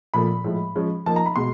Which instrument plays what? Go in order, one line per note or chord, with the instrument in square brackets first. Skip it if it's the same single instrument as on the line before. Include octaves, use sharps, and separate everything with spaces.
[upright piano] A#2 F3 A3 B5
A2 F3 G#3
F3 G#3 C#4
F3 A#3 D#4 A5
A#5
B5
B2 G#3 C6